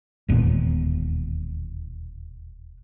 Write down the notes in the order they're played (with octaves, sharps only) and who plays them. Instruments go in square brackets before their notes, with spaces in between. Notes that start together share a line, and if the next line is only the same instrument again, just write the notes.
[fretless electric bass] E1 D#2 A#2 B3